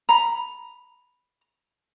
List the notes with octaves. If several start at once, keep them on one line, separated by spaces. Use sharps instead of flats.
A#5 B5